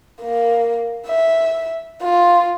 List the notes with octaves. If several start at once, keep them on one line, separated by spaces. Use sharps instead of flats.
A#3
E5
F4